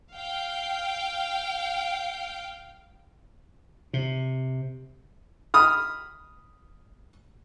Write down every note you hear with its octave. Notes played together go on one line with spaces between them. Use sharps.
F5 G5
C3
B5 D#6 F6